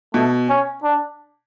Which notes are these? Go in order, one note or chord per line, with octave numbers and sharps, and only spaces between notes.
B2 A3
C#4
D4